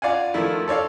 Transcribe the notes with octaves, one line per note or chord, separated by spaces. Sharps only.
F4 D5 F5 F#5 G#5
D#3 F3 A3 E4
A4 C#5 D5 F5